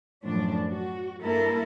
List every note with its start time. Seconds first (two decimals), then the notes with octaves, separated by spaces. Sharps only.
0.24 F#2 A2 F3 D4
0.69 F#4
1.20 G2 A#3 E4 A4 A#4